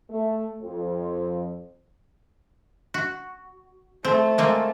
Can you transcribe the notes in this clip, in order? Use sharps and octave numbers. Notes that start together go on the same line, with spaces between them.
A3
F2
F#4
A3 C4
G#3 A#3 C4